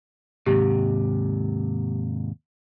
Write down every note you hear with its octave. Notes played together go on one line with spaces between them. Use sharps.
D#2 G#2 C3 G4